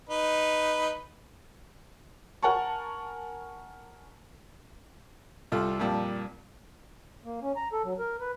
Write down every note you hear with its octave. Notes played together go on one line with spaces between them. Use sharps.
D#4 B4
A#4 F#5 G#5 A5 C#6
C2 G3 F4 A4
F2 A#2 G3 A5
A#3
C#4
A#5
A4
F#3
A#4
B4